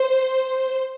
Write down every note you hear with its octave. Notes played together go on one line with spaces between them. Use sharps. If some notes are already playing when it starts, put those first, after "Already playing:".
Already playing: C5